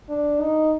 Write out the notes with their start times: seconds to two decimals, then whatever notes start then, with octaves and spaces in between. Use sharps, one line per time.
0.09 D4
0.41 D#4